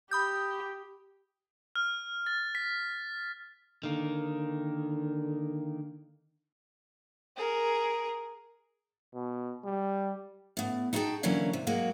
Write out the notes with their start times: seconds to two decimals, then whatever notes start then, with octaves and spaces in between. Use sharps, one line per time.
0.11 G4 B5 D#6 G6
1.75 F6
2.26 A6
2.55 B6
3.83 D3 D#3 A#3
7.37 G#4 A#4
9.14 B2
9.65 G3
10.57 A2 B3
10.93 D#4 E4 F#4 G#4 G5 A5
11.23 D3 E3 F#3 A#3 C#4
11.53 C3
11.67 F#3 G#3 A#3 F#4